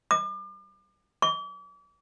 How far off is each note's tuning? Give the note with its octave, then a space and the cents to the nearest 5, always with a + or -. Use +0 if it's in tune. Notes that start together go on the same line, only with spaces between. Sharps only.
D6 +40
D6 -40